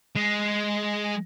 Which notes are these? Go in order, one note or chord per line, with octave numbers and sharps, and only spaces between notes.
G#3